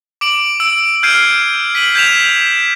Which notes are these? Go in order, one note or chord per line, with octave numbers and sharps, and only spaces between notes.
D6 D7 F#7
E6 D7
F6 G6 G#6 C7 D7 D#7
B6 D#7 F#7
G6 G#6 B6 E7 F7